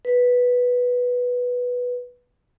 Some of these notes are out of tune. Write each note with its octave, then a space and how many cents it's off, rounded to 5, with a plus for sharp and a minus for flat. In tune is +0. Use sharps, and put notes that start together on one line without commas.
B4 -5